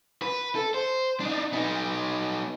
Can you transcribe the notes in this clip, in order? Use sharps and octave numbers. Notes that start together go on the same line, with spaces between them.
B4
A4
C5
D4 D#4
B3 D#4